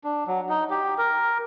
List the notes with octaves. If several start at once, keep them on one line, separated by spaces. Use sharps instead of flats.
D4
F#3
D#4
G4
A#4